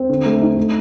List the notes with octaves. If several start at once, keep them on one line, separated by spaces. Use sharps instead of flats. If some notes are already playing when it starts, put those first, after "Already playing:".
Already playing: C4
D3
A3
D#4
A3